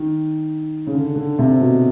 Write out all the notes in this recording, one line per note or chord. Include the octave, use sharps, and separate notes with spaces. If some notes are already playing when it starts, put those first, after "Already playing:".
Already playing: D#3
C#3
D3
D3
C3
B2